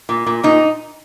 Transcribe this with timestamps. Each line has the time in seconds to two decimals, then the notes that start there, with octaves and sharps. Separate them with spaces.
0.09 A#2
0.26 A#2
0.43 A#2 D#4